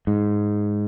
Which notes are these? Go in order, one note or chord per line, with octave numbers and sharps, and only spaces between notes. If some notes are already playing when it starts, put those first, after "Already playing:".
G#2